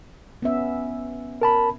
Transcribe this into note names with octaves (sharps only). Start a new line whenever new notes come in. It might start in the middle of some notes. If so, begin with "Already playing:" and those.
B3 C#4 E5
A#4 A5 B5